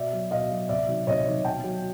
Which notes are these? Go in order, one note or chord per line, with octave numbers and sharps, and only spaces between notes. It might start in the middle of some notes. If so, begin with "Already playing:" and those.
Already playing: B2 D5 E5
F#3
B2 D#5 F5
F#3
C3 D5 E5
D#3 F#3
C3 C#5 D#5
D#3 F#3
B2 G5 A5
F#3